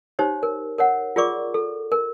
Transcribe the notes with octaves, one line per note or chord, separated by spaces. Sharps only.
D#4 G4 C5 C#5
A#4
A#4 C#5 F#5
F4 G#4 A#4 D5 C#6 D6
A4
A#4